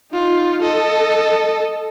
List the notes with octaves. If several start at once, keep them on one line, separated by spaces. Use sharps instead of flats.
D#4 F4
A4 D#5